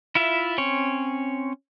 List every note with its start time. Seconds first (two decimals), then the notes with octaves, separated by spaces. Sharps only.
0.15 E4 F4 E5
0.58 C4 C#4 C#5